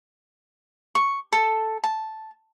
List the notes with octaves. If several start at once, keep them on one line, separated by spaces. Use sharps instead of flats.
C#6
A4
A5